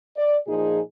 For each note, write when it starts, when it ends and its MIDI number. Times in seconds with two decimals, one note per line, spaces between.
0.16 0.37 74
0.47 0.80 46
0.47 0.80 53
0.47 0.80 63
0.47 0.80 68